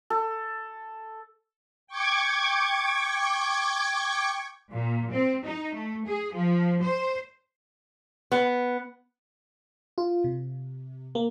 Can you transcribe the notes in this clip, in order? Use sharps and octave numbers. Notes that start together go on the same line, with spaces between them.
A4
G5 C#6 D6 G#6
A#2
C4
D#4
A3
G#4
F3
C5
B3
F4
C3
A#3